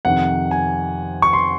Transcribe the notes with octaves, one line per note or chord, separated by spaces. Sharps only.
F2 C3 D#3 F#5
G#5
C#6
C6